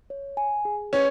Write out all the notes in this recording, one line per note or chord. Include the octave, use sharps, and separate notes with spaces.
C#5
G#5
G#4
C#4 B4